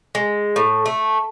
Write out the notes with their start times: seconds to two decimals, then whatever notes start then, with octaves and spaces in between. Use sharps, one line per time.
0.15 G#3
0.56 A2
0.86 A3